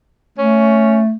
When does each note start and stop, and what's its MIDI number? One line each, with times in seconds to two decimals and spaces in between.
0.38 1.15 57
0.38 1.00 61